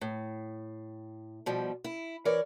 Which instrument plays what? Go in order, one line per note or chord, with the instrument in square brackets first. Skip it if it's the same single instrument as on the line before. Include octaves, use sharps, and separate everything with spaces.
[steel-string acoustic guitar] A2
B2 F3 G3
E4
E3 A#4 C#5 D5